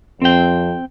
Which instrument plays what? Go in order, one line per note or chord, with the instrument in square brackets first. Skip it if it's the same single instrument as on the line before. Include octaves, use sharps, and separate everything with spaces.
[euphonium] F2 [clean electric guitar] C4 G5